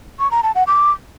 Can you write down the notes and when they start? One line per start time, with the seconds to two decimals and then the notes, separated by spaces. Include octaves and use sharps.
0.19 C#6
0.31 A#5
0.43 A5
0.55 F#5
0.67 D6